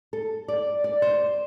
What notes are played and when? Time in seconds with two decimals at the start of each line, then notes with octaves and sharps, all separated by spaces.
0.13 A4
0.48 D5
0.84 D5
1.02 C5